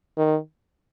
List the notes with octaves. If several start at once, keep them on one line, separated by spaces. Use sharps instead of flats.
D#3